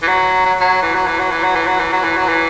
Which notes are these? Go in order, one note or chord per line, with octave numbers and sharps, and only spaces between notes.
E3
F#3
F#3
F#3
E3
F#3
E3
F#3
E3
F#3
E3
F#3
E3
F#3
E3
F#3
E3